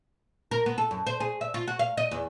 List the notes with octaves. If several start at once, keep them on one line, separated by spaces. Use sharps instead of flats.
A#4
B3
A4
F#2
C5
G#4
E5
F4
F#4
F5
D#5
E2